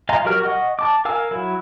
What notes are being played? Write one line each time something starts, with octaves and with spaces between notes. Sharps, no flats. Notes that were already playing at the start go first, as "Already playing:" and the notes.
D#5 F5 G#5 A#5 C6
F#3 F#4 G4 A#4 F6
D#5 F#5 C#6
A5 D6
A#4 F5 G#5 E6
F#3 E4